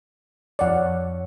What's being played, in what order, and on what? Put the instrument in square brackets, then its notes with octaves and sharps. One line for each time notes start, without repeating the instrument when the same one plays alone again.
[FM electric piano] F2 C#5 [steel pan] D5 F#5